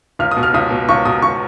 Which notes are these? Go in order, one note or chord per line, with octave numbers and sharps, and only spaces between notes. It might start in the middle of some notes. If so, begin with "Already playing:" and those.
C#2 F6
D#6
B2
F6
C#2 D#6
B2
C#2 C#6
B2 D#6
C#2 C#6